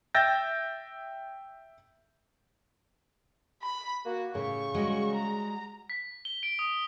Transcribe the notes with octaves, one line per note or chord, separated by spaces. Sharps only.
E5 G5 E6 G6 A6 A#6
B5
A#3 F#4
A2 C#3 G4 C#6
G3 G#3 F#4
A#5
B6
G7
D7
D#6